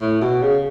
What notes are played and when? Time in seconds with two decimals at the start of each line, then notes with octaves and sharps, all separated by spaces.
0.02 A2
0.22 B2
0.42 C#3